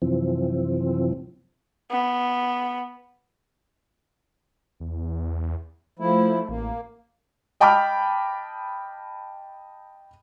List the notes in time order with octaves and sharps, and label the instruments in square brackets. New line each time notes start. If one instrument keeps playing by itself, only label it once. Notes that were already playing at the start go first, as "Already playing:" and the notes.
[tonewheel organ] F#2 C3 E3 F3 C4
[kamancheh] B3
[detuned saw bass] E2
[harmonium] F3 E4 [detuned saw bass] A3
[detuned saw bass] A1 [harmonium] A#3
[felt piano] D#5 G5 A5 B5 D6 F6